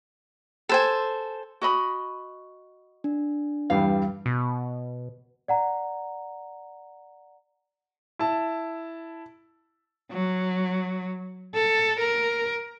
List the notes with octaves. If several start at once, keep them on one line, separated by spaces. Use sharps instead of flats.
A4 C5 G#5
F#4 D#5 B5
D4
E2 G2 G3 F5
B2
D5 F#5 A#5
E4 A5
F#3
A4
A#4